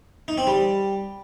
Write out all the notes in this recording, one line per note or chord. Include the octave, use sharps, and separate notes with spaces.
D#4
C4
G3